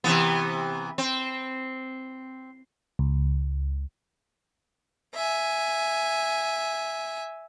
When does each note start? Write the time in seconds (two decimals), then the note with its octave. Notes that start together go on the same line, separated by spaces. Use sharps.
0.04 C3 E3 B3
0.98 C4
2.99 C#2
5.15 E5 G#5